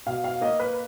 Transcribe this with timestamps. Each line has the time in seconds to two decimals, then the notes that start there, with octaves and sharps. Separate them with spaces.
0.06 B2 F5
0.24 F5
0.41 A#3 D#5
0.59 B4